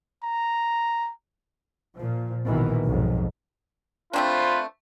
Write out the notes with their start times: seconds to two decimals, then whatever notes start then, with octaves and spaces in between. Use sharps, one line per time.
0.23 A#5
1.95 A#2 F3
2.46 A#1 B2 D#3 E3
2.85 B1 F2 G#2 B2
4.13 A3 C4 D4 F4 B4 C5